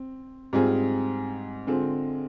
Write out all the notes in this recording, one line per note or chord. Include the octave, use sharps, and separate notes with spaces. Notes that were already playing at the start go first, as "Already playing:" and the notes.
Already playing: C4
G#2 G3 C4 F4 G#4
D3 G#3 C4 F4